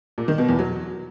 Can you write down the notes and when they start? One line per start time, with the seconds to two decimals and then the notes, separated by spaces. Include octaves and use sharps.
0.18 A#2
0.28 D#3
0.38 B2
0.48 E2
0.59 F#3